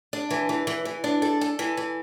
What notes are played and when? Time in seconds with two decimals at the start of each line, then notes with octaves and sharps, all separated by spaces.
0.13 D4
0.31 E3
0.49 E3
0.67 E3
0.85 E3
1.04 D4
1.22 A4
1.41 A4
1.59 E3
1.77 E3